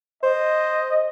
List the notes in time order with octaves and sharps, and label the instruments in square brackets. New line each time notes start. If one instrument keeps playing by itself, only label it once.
[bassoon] C5 [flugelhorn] D#5